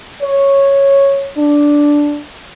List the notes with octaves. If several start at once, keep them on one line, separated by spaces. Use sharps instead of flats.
C#5
D4